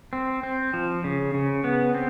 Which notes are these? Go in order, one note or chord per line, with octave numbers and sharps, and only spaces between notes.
C4
C4
F3
C#3
C#3
B3
C4